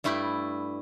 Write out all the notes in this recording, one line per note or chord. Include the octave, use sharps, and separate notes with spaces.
G2 A3 E4 G5 B5